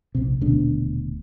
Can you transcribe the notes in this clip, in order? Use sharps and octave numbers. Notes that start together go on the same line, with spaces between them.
A#1 C3
D#1 D2 B2 D4